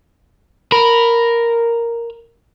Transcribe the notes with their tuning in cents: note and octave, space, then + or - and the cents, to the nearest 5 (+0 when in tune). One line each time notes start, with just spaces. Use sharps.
A#4 +0 B5 +0